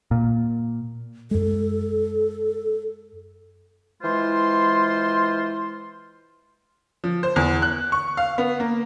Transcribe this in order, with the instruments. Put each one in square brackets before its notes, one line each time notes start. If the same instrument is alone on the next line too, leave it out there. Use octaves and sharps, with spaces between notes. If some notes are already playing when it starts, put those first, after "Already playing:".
[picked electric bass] A#2
[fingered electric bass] F#2 G#3 [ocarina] A4
[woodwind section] E3 G#3 F4 C5 C6
[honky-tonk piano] F3
C5
E2
F#6
C#6
F5
B3
A#3